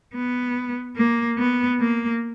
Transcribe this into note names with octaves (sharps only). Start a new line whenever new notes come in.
B3
A#3
B3
A#3